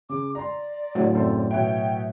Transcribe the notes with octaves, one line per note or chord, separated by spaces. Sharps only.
C#3 D6
D5 A#5 C6
A2 F#3
F#1 C4 A4
B2 C#5 E5 G5